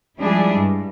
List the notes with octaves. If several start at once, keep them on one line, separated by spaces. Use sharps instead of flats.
F3 G3 G#3 D4 E4 G#4
G2